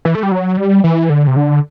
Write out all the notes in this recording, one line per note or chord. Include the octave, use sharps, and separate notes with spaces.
E3
A3
G3
F#3
G3
E3
D3
C3
D3